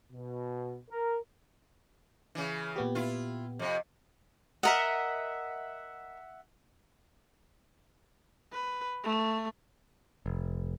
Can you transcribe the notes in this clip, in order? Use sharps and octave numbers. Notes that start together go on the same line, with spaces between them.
B2
A#4
C#3 E3
A#2 B3 G4
E4 F4
F2 C3
A#4 D#5 E5 F#5
B4
A3
F1